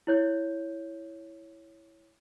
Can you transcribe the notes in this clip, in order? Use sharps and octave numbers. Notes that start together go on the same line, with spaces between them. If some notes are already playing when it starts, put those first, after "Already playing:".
E4 C#5 G6